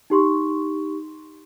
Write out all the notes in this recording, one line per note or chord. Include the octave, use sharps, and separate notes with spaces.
D#4 G4 C6 C#6